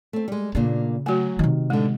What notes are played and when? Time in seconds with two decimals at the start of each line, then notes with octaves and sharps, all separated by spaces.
0.13 A3 C4
0.28 G3 G#3
0.55 A#2 C#3 A#3 D4
1.06 F#3 A3 F#4 G#5
1.39 C3 D#3
1.70 A2 D3 G#3